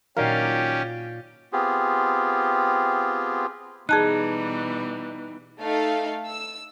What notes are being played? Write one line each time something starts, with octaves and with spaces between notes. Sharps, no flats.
A#2 D#3 F#3 C#4 G4 A#4 D5 F5
B3 C4 F4 G4 G#4
B2 E3 G3 D#4 G#4 A5 F#6
A3 D#4 A4 F5
E6